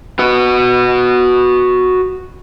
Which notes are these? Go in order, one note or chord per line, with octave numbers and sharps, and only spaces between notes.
F#4 B4